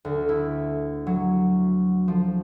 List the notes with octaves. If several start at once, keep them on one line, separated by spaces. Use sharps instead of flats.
D2
E4
F#3
F3